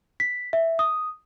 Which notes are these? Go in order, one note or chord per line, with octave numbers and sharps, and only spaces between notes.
B6
E5
D#6